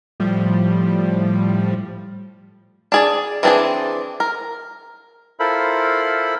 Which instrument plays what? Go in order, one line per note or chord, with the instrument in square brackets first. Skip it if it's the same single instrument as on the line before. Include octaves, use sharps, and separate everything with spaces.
[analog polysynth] A2 F3 G3
[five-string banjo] D4 G#4 D5
E3 C4 D4 G4 G#4
A#4
[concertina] E4 F4 A4 A#4 C5 B5